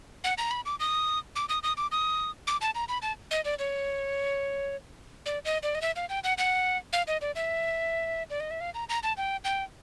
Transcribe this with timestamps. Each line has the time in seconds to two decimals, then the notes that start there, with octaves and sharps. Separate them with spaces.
0.24 F#5
0.38 A#5
0.51 B5
0.66 D6
0.80 D#6
1.36 D6
1.49 D#6
1.63 D#6
1.77 D6
1.92 D#6
2.47 D6
2.61 A5
2.75 A#5
2.89 B5
3.02 A5
3.31 D#5
3.45 D5
3.59 C#5
5.26 D5
5.45 D#5
5.63 D5
5.75 D#5
5.82 E5
5.96 F5
6.09 G5
6.24 F#5
6.38 F#5
6.93 F5
7.08 D#5
7.22 D5
7.35 E5
8.30 D5
8.40 D#5
8.51 E5
8.61 F5
8.74 A#5
8.89 A#5
9.03 A5
9.17 G5
9.45 G5